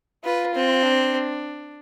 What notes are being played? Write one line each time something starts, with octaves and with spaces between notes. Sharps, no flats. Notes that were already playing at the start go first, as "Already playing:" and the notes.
F4 B4
C4
D4